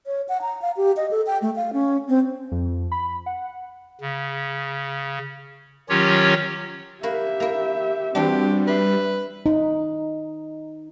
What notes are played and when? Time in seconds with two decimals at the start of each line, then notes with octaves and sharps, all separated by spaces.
0.06 C#5
0.29 F#5
0.42 A#5
0.62 F5
0.77 G4
0.97 D#5
1.11 A4
1.27 G5
1.42 A3
1.56 F5
1.73 C#4
2.08 C4
2.52 F2
2.92 B5
3.26 F#5
4.01 C#3
5.89 D#3 F#3 C#4 F4 G4 C#5
7.03 A#3 F#4 G4 E5 B5
7.40 A#3 E4
8.15 E3 G3 C4 D4 F#4 G4
8.67 B4 E5 C6
9.46 D#4